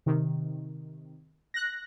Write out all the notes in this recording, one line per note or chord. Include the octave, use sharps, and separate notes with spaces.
C3 D#3
F#6 A#6